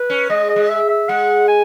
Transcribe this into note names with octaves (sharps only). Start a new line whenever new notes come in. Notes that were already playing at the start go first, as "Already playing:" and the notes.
Already playing: B4
C#4
G#3 D#5
D#5
G#3
E5
E5
G#3 F#5
G#5